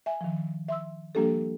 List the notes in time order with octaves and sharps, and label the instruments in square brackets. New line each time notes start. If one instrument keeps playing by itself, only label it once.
[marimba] E5 G#5
D#3 F3
E5 C6 E6
F3 G3 A#3 D4 G4 A4